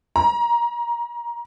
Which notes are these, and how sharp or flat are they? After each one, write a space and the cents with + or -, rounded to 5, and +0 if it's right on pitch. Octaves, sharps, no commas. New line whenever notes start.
A#5 +20